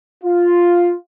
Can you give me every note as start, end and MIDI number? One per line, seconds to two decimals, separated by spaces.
0.24 0.94 65